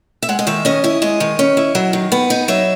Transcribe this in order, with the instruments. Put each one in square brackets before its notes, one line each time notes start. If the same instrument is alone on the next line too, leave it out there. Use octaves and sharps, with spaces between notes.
[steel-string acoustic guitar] E5
G#3 F#5
D#5
D#3 E5
C#4 D#5
E4 D#5
G#3 D#5
D#3
C#4
E4
F#3
D#3
B3
D#4
F#3 E5